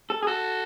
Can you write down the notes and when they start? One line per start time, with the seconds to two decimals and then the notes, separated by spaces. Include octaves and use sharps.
0.10 A4
0.23 G#4
0.27 F#4 A4